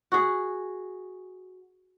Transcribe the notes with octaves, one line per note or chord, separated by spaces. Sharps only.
F#4 G#4